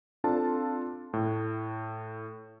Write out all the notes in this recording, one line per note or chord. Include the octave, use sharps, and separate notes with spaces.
C4 D4 F4 A4 A5
A2